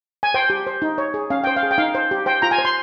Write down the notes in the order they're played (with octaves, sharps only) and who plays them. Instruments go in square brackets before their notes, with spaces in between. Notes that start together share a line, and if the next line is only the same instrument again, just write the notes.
[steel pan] G#5
C5 G5
G4
C5
D#4
C#5
G#4
C#4 F5
C5 G5
F5
G#4
G5
D#4 F5
C5
G4
C5 G5
F4 A#5
G#5
C5
C6